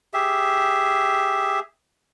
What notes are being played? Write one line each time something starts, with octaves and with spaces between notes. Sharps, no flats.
G4 G#4 E5